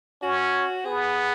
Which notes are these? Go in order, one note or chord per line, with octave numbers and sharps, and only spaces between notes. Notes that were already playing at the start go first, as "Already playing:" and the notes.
C#4 F#4
B3 G#4